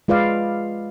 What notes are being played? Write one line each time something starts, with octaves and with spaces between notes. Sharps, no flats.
G#3 F4 B4 D5 F5